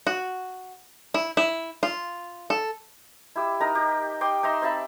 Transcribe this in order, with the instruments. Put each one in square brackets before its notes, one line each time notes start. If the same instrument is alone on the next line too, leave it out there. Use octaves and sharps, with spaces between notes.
[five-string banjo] F#4
E4
E4
F4
A4
[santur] E4 G4 E6
D#4 A#4 A#5
G4
G5 C6 D6 D#6
D#4 E5 A#5 C6
C4 E5 A5 B5